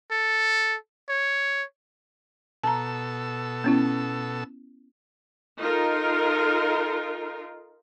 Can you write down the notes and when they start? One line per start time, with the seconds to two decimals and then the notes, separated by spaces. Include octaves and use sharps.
0.11 A4
1.09 C#5
2.64 B2 A4 A5 A#5 E6
3.64 B3 C#4 E4
5.58 D#4 F4 A4 A#4